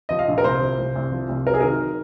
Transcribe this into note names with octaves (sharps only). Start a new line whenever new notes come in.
F3 D#5
F5
A#1
A#4
C2 C5
F3
C2
C2
F3
C2
F#3 A#4
G#4
D#3 A#4